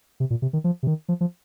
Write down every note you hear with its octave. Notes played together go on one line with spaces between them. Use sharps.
C3
A#2
C3
D#3
F3
C3
D#3
F3
F3